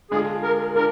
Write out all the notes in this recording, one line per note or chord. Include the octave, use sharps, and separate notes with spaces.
D3 G#3 D4 F4 G#4
A#4
D4 F4 A#4